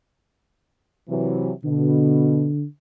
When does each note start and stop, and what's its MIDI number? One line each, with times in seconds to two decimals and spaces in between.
1.09 1.51 48
1.09 1.51 52
1.09 1.51 54
1.65 2.50 47
1.65 2.64 50